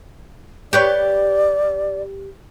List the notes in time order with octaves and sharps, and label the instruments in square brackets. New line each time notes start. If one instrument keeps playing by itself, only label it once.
[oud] G4 B4 C#5 [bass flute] D5